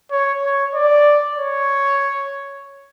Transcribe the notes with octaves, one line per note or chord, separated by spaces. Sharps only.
C#5
C#5
D5
C#5